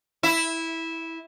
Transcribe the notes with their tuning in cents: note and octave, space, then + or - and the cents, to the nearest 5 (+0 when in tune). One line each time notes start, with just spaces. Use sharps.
E4 -10